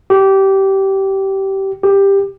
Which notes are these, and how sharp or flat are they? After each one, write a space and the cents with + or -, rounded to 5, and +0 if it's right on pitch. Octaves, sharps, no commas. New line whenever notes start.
G4 -20
G4 +10